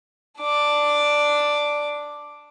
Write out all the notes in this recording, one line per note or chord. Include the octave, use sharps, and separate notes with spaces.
D4 D6